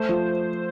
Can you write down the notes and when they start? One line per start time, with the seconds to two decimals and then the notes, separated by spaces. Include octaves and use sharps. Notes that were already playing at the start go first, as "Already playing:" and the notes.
Already playing: A3 C5
0.09 F3